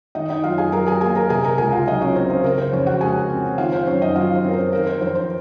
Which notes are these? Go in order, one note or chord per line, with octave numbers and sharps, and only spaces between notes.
D#3 D#4 D#5
D#4 D#5
F#2 F4 F5
G#4 G#5
F#3 A#4 A#5
G#4 G#5
A#3 G#4 G#5
A#4 A#5
C3 G#4 G#5
A#4 A#5
C#2 G#4 G#5
F4 F5
F#3 D#4 D#5
C#4 C#5
C4 C5
C5
C#3 A#4
C5
F2 C#4 C#5
F#4 F#5
G#3 G#4 G#5
C4
D#3 F4 F5
C5
F#2 C#4 C#5
D#4 D#5
F#3 F4 F5
C5
C4 A#4
C5
D#3 A#4
C5
F2 C5
C5